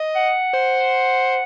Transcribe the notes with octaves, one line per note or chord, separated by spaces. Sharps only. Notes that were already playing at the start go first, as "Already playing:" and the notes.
Already playing: D#5
F#5
C5